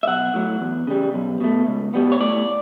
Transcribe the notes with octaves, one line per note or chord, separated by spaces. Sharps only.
E5
B1 F#5
A2 F#3
E2
C#3 G3
B1
B2 A3
C#2
B2 G3 B3
C#5
A2 D5